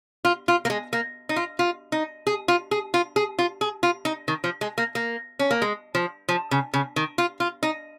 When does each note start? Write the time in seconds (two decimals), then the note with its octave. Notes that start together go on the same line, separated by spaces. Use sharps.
0.25 F4
0.48 F4
0.65 A#3
0.70 G#3
0.93 A#3
1.29 D#4
1.36 F4
1.59 F4
1.92 D#4
2.27 G#4
2.48 F4
2.71 G#4
2.94 F4
3.16 G#4
3.39 F4
3.61 G#4
3.83 F4
4.05 D#4
4.28 D#3
4.44 F3
4.61 G#3
4.78 A#3
4.95 A#3
5.39 C#4
5.51 A#3
5.62 G#3
5.95 F3
6.29 F3
6.51 C#3
6.74 C#3
6.96 D#3
7.18 F4
7.40 F4
7.63 D#4